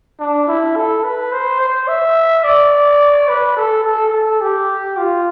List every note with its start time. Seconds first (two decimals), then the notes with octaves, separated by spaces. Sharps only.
0.19 D4
0.47 E4
0.76 A4
1.04 B4
1.32 C5
1.60 C5
1.88 E5
2.44 D5
3.28 B4
3.57 A4
3.84 A4
4.13 A4
4.41 G4
4.97 F4